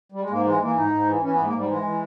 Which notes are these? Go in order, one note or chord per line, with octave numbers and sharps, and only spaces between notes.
G3
G#3
G#2 A#3
E3 G#3
E3 A#3
G#2 D#4
G#2
E3
E3 C#4
B3
G#2
A#3
G#2 G3
E3 G#3
E3